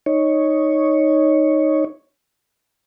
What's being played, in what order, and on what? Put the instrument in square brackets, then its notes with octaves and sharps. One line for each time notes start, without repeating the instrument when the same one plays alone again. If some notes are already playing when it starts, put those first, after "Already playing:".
[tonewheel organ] D#4 C#5